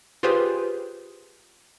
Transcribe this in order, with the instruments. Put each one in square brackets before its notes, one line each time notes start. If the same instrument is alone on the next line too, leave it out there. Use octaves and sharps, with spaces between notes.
[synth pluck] F4 G4 G#4 B4 C5